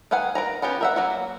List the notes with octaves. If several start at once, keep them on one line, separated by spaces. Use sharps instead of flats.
D#3 B4 F5 F#5 G#5
A#4 B4 A#5
B3 C#4 F4 G4 B4
A#4 E5 F#5
F#3 A#3 F#4